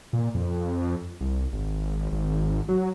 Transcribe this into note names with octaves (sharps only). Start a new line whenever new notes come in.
A#2
F2
C2
G#1
G#1
F#3